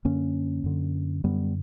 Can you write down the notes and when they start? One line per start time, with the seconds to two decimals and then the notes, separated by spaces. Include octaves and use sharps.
0.05 F#2 D3 A#3 C#4
0.64 F#2 D3
1.24 F#2 D3 G3 B3